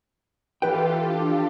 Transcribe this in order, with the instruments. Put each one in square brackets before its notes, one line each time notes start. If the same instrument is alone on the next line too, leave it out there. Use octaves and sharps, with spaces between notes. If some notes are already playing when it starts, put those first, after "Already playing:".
[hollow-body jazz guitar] E3 B4 G5 [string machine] F4 G4 A4
[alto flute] D4